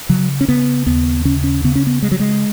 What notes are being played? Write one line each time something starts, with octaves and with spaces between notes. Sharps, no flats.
C#3 F#3
C#4
C#3 B3
D#2 B3
C#3 C#4
C#4
C#3 B3
C#4
B3
C#3 G#3
F#3
G#3